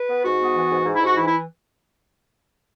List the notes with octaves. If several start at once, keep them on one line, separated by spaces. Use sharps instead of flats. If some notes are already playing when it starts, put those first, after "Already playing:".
Already playing: B4
B3
G#2 F#4
B3
E3
G#2
G#2
E4
G#2
F#4
E3 E4
E4